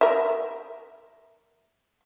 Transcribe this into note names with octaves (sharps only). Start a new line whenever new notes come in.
A#4 E5